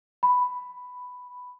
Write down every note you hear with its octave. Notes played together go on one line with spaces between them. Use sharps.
B5